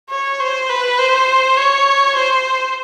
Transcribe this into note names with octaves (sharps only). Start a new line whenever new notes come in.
C#5
C5
B4
C5
C#5
C5